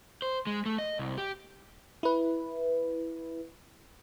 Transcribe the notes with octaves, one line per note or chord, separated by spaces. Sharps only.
C5
G#3
A3
D#5
C2
G4
E4 B4